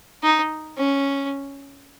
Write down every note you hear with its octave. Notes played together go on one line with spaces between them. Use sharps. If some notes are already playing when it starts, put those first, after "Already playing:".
D#4
C#4